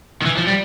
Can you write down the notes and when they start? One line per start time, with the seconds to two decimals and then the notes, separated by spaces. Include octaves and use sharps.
0.22 D#3
0.25 E3
0.37 F3
0.47 G3